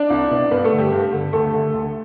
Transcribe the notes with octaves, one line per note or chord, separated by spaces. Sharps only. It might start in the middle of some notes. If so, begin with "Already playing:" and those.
Already playing: D4 D5
C2
B2
G2 B3 B4
A3 A4
D3
G3 G4
G2
D3
D2 A3 A4
D3
D2